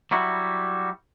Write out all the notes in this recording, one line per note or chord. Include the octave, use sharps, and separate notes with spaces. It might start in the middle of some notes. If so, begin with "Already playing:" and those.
F#3 G3 E4 F#4